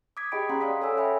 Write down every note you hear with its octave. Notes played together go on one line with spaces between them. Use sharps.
D6 D#6 G#6 B6
G4 G#4 D#5 G5 B5 D7
C#4 F#5 A#5 C6
D5 F5 D#6 B6
A4 C#5 F#5 G#5 E6
E5 G5 G#5 B5